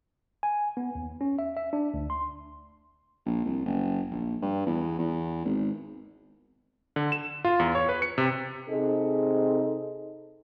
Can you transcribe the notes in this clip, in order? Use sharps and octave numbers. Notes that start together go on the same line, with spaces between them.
G#5
B3
D#2
C#4
E5
E5
D4
D2
C6
A#1
C2
F#1
A#1
G2
E2
E2
G#1
D3
E7
F4
E2
C#5
B4
C#7
C3
C3 C4 D#4 G#4 A4 D#5